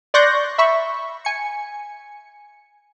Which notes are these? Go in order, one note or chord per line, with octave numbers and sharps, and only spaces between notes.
D5 C6 C#6 F#6 G6 A#6
E5 B5 C#6
G#5 C#7